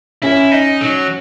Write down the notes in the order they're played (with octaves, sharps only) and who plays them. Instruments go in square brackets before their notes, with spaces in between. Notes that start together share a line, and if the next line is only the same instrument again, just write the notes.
[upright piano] C#4 [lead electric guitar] E4
[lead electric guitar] D#4
F#3